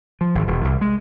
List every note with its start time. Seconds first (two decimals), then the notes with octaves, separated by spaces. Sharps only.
0.21 F3
0.35 G#1
0.48 E1
0.65 C2
0.81 G#3